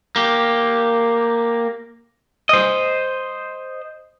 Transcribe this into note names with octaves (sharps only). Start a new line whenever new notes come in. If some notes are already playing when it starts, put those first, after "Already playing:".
A#3 G4
C5 D#5